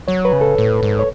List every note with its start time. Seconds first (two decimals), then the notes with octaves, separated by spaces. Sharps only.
0.08 F#3 C#5
0.25 B4
0.33 C#3
0.41 A4
0.58 A2
0.83 G#2
0.99 C#5